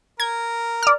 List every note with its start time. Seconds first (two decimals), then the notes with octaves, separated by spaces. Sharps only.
0.20 A#4 G#6
0.83 D5 F6